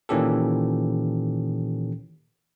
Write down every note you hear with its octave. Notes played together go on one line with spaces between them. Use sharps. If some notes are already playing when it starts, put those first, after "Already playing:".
A#2 D#3 E3 C#4 G4 A4